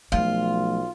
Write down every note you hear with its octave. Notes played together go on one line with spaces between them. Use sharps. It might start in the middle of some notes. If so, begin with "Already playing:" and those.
B1 F3 A3 F4